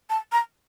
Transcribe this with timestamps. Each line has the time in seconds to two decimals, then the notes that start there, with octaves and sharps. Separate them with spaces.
0.10 A5
0.32 A#5